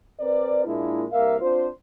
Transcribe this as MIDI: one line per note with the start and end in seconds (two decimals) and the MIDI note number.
0.20 0.64 60
0.20 0.64 70
0.20 0.64 71
0.20 0.64 74
0.65 1.05 46
0.65 1.05 56
0.65 1.05 58
0.65 1.05 62
0.65 1.05 64
1.11 1.36 36
1.11 1.36 58
1.11 1.36 70
1.11 1.36 76
1.11 1.36 77
1.40 1.66 60
1.40 1.66 62
1.40 1.66 65
1.40 1.66 72